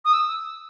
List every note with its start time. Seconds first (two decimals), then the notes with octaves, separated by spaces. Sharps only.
0.04 D#6
0.13 E6